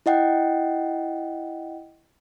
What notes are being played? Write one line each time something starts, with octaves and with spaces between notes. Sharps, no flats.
E4 D#5 F#5 G5